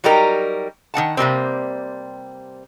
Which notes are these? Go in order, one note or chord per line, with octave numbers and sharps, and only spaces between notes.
F#3 G3 D#4 G4 A#4
D#3 C4 F#5 A5
C3 G3 A#3 C4